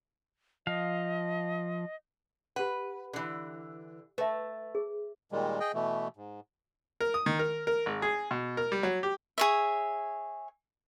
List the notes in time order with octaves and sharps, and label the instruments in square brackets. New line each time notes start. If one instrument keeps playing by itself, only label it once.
[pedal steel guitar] F3 F5 [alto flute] D#5
[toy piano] G4 F#5 [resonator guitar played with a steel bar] B4
[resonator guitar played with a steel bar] D3 E3
[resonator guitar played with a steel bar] A3 [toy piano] B4 E5
[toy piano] G#4
[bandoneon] A#2 D#3 G3 G#3
G#4 D#5 G5
B2 E3 A3
G#2
[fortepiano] A#4
D#6
D#3
A#4
A#4
G#1
G#4
B2
A#4
G3
F#3
G4
[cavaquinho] G#4 C#5 E5